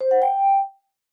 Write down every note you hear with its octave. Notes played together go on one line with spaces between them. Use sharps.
C5
F#5
G5